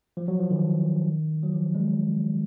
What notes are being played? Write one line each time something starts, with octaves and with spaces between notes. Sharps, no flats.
F3
F#3
F3
D#3
F#3
F3
G#3